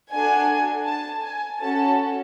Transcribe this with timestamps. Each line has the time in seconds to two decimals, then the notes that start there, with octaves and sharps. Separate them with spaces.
0.12 D4 F#4 A4 G#5
0.86 A5
1.23 G#5
1.60 C#4 F#4 A4 A5